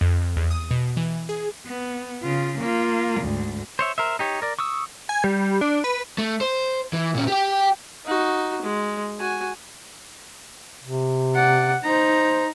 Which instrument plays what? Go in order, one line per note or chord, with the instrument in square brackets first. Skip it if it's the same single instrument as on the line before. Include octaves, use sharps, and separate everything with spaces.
[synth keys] F2
F2
E2
D#6
B2
E3
G#4
[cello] B3
C#3 F4
A#3 F4
D2 G#2
[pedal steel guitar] C5 C#5 E5
A#4 C5 E5
D#4 G4 C#5
A#4 D5
C#6 D#6 E6
[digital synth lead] G#5
G3
D4
B4
[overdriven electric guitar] A3
C5
E3
A#2 C#4
G4 G5
[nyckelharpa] D#4 F#4
G#3
F#4 G#5
[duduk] C3
[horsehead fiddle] D5 F#5
[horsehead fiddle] D#4 A#5 [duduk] C5